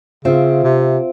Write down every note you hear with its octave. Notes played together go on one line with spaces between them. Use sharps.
C#3 C4 F4 C5 E5
C3